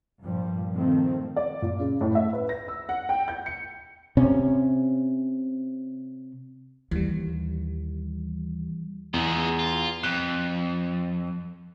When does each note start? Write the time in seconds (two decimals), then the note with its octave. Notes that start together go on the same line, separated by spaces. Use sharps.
0.22 G2 A#2 F3 G3
0.75 D#3 F3 A3 C4
1.36 D5
1.62 A#2
1.80 C#3
2.01 A2
2.15 E5
2.33 B4
2.49 A#6
2.68 E6
2.89 F#5
3.09 G5
3.28 G6
3.46 C#7
4.17 C3 C#4
6.91 D#2 E3 G3
9.14 E2 G#3 F4
9.59 F4
10.04 F2 F#6